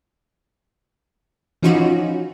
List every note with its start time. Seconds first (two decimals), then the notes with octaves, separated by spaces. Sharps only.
1.63 E3 F3 C#4 D#4 F4 F#4